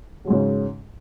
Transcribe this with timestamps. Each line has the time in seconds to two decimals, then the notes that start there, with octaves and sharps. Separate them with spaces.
0.25 F#3
0.27 G#3
0.30 G#2
0.33 C#3